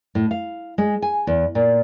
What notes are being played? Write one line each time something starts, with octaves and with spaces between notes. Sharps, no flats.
A2
F5
G#3
G#5
E2
A#2